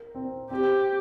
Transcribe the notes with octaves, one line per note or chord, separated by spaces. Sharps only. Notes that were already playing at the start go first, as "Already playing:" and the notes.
Already playing: A#4
C4
C4 G4